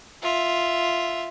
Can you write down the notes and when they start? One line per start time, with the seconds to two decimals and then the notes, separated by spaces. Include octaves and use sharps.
0.22 F4 E5